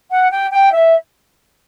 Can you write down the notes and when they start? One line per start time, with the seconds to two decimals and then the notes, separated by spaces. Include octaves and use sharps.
0.11 F#5
0.31 G5
0.51 G5
0.73 E5